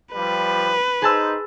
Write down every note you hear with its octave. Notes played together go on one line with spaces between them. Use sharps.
F3 G3 B4
D#4 G#4 C5 A5 E6